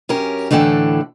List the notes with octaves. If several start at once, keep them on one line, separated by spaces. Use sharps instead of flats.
F#2 C#4 G4 A#4
A2 D3 E3 A4 F#5 G5